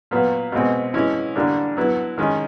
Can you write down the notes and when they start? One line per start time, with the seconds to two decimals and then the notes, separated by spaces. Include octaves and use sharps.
0.11 A#2 F#3 B3
0.52 B2 G#3 C4
0.94 E3 G#3 C#4 E4
1.35 D3 G3 A#3 D4
1.77 F#3 B3 E4
2.18 D#3 G#3 C#4